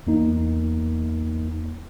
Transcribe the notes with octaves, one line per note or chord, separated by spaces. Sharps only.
E2 A#3 D#4